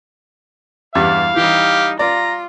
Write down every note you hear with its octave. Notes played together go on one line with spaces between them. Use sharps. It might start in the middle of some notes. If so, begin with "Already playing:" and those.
E2 G2 G3 E4 F5
E3 G3 D#4 G4
F4 D5 A#5